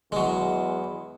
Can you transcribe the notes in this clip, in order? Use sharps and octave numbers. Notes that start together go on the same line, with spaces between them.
E2 F#3 G#3